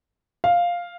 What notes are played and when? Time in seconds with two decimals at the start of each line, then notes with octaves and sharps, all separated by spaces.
0.44 F5